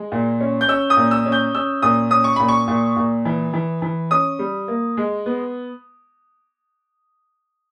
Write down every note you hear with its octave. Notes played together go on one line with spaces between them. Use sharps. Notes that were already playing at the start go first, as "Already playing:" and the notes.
Already playing: G#3
A#2
C#4
G6
C#4 E6
D#6
A#2
E6
C#4
G6
C#4 E6
A#2 D#6
C#4 D#6
C#6
A#2 B5
C#6
A#2
A#2
E3
E3
E3
C#4 D#6
G3
A#3
G#3
B3